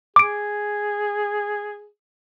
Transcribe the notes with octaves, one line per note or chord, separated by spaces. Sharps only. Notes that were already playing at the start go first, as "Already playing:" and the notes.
G#4 D6 D7